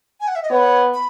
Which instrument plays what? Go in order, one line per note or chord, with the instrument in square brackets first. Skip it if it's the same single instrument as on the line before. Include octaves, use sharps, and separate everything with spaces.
[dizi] G#5
F#5
E5
D#5
[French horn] B3 [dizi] C#5
[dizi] B5